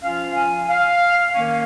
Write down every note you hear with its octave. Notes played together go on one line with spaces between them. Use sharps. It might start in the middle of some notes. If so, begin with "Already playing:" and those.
F3 C#4 F4 F5
G#5
F5
D#3 A#3 C#4 F5